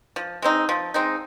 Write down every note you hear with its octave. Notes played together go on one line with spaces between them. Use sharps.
F3
G#3 C4 D#4
F3
G#3 C4 D#4